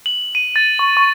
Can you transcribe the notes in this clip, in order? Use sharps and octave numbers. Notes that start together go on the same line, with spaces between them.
F#7
D#7
A6
C#6
C#6